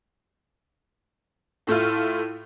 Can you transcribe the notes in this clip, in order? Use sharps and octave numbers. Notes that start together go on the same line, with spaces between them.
A2 A3 E4 F4